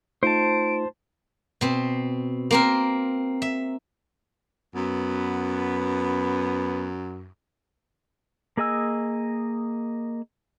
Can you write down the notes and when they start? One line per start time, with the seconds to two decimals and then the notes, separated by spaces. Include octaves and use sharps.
0.23 A3 D#4 F4 C5 A5 D7
1.61 B2 C4
2.51 A#3 C4 A#4
3.42 E5
4.75 F#2 B3
8.57 A#3 G#4 D#5 G#5 E6